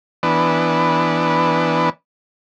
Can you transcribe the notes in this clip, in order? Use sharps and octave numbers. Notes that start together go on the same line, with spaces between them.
E3 B3 D4